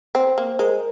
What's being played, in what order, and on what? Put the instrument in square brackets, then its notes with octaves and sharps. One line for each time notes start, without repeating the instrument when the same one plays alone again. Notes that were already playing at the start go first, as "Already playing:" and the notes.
[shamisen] C4 [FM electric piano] C5
[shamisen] A#3
[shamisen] G#3 [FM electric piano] A#4